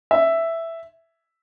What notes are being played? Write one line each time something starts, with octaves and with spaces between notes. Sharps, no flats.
E5